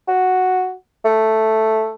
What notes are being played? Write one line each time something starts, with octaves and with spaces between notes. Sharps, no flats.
F#4
A3